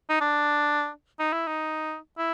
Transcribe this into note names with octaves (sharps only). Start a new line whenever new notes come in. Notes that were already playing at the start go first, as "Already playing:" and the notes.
D#4
D4
D#4
E4
D#4
E4